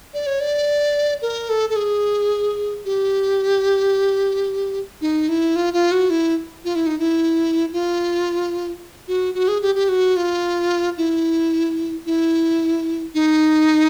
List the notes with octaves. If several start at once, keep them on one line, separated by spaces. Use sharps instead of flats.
D5
C#5
D5
A#4
A4
A4
G#4
G4
D#4
E4
F4
F4
F#4
E4
F4
E4
D#4
E4
F4
F#4
F#4
G#4
G4
G4
F#4
F4
E4
E4
D#4